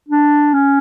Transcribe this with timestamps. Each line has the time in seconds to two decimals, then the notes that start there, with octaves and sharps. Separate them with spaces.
0.09 D4
0.53 C#4